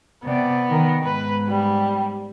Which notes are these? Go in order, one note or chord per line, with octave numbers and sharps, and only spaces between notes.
C3 B3 D5
D#3 A#4
G#2 B4
G3